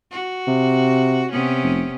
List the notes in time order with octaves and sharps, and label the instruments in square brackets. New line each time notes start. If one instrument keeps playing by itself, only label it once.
[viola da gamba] F#4
[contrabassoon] C3
[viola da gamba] C3 B3 C#4
[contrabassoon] F1